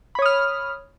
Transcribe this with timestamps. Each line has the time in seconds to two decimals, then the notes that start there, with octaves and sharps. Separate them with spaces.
0.15 B5
0.19 C#5
0.22 D#6
0.26 F6